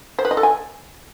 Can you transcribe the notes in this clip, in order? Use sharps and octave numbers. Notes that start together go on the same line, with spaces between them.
C5
B4
D#5
A4
G#5